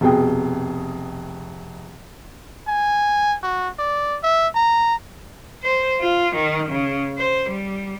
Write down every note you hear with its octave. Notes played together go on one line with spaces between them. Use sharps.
F1 B2 G#4 G5
G#5
F#4
D5
E5
A#5
C5
F4
D#3
C#3
C5
G3